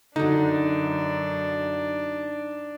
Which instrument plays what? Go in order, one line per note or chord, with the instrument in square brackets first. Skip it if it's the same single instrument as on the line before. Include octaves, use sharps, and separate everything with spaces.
[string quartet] F#2 [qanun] D3 F#3 [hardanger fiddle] D4 [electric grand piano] D#4